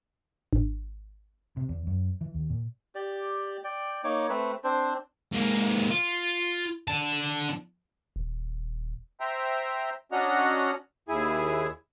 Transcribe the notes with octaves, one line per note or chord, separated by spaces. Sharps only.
G#1
C3
E2
F#2
E3
D#2
A#2
G4 D5
D5 G5
A#3 D#4 C#5 D6
A3 C4 B4
C4 D4 C5
G#2 A#3
F4
D3 A5
D#1
C5 E5 G5 A#5
C#4 D4 F#4 D#5 F#5 A#5
D#2 E4 G#4 G#5